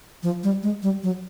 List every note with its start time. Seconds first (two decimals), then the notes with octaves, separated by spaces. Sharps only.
0.23 F3
0.44 G3
0.63 G#3
0.83 G3
1.03 F#3